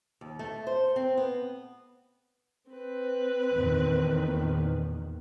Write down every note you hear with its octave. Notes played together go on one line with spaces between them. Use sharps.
D#2
A3
C5
C4
B3
C4 B4
E2 A#2 D#3